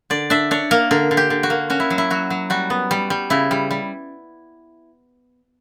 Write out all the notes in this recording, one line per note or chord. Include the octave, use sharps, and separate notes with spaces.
D3 D5
D4 E5
D4 C#5
A#3 A#4
D3 A#4
D3
G4
D3
F#4
A#3
C#4 F#4
E4
F#3
E4
F#3 F#4
F#3
G3 F#4
B3
G3
G3
C#3 E4
G3
G3